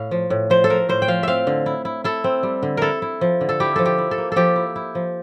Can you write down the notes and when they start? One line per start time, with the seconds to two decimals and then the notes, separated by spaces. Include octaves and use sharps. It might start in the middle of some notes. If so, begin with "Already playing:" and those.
Already playing: A2 F5
0.11 F3
0.30 A2
0.50 F3 C5
0.64 A4
0.70 F3 A#4
0.89 A2 C5
1.02 G5
1.08 F3 F5
1.23 C4 E5 F5
1.47 D3
1.66 E4
1.85 E4
2.04 E4 A4
2.24 C4
2.43 G3
2.63 D3
2.77 E4 A4 A#4
3.02 E4
3.21 F3
3.41 D3
3.49 A4
3.60 E4 G4
3.76 F3 A4
3.86 G4
3.98 E4
4.11 A4
4.18 A#3
4.32 F3 G4 A4
4.56 E4
4.76 E4
4.95 F3